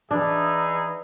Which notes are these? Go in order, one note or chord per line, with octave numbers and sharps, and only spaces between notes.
E3 D4 D#4 G#4 E5